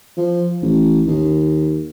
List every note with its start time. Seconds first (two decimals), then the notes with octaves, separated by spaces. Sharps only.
0.17 F3
0.62 A1
1.07 D#2